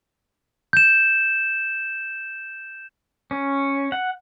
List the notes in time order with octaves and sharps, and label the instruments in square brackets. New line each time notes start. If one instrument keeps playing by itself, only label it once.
[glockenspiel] G6 E7
[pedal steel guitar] C#4
F#5